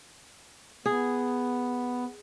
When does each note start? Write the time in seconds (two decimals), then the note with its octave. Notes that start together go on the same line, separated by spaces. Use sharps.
0.86 B3 G#4